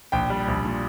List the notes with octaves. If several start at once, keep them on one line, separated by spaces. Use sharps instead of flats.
A#1 G5
G3
A#1
A#2